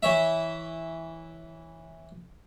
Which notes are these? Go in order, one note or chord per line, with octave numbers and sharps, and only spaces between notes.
E3 C#5 E5